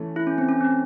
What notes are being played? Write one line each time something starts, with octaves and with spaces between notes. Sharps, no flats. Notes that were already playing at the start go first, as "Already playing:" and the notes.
Already playing: E3 A3 C#4
E4
C#4
C4
C#4
C4